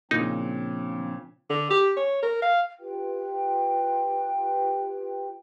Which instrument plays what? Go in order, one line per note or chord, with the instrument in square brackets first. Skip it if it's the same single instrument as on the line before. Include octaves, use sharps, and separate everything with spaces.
[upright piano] A#2 C#3 [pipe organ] F3 C4 D4 [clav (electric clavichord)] D#4
[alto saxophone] D3
G4
C#5
A#4
F5
[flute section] F4 G4 B4 G5